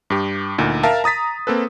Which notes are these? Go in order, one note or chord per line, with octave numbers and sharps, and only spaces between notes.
G2 G4
D2 A#2 D#4
A#4 E5 F5 A5
A#5 D#6 A6 B6
A#3 C4 A4 B4